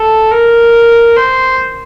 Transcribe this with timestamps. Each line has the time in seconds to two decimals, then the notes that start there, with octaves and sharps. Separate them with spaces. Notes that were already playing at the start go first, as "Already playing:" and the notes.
Already playing: A4
0.32 A#4
1.17 C5